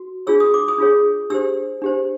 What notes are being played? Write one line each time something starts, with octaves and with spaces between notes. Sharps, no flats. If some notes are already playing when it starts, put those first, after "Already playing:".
Already playing: F#4
D4 F4 G#4 C#5 E6
D#6
D6
D#6
D4 F4 G#4 C#5
D4 G4 C5 E6
D4 G4 C5